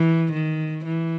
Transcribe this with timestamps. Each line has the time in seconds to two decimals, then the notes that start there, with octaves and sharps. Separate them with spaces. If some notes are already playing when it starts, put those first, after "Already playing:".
Already playing: E3
0.32 D#3
0.85 E3